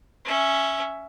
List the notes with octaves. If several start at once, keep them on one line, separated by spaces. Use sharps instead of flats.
C#4 E5